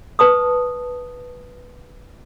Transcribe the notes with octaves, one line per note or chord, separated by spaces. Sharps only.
B4 A5 D#6